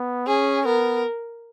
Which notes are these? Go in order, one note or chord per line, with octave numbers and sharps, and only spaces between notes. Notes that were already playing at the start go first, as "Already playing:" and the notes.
Already playing: B3
C#4 G#4
B3 A#4